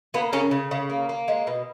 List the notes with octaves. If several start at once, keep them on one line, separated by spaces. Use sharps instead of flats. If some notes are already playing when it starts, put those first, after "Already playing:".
A#3 B3
C#3 A#3 C#4
C#3
C#3
A#3
A#3
G#3
B2